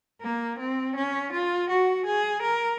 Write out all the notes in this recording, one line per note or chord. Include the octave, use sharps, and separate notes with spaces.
A#3
C4
C#4
F4
F#4
G#4
A#4